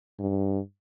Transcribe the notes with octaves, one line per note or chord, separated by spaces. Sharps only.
G2